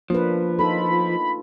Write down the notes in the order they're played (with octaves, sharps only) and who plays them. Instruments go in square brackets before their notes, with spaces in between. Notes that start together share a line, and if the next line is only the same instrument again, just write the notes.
[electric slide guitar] F3 [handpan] A#3 D4 B4
[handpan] D#4 F4 A4 [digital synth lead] B5